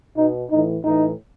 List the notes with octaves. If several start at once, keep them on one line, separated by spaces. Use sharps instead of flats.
B2 D#4
A2 E3 D#4
A2 E3 D#4